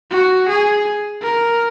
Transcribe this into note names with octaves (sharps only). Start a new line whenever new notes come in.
F#4
G#4
A#4